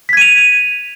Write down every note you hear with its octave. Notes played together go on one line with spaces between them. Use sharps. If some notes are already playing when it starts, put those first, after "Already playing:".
G#6 B6 D#7 F7